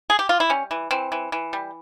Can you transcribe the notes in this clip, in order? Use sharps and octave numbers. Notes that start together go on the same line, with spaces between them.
G#4
G4
F4
E4
G3 C#4
E3
E3 C4
E3
E3
G3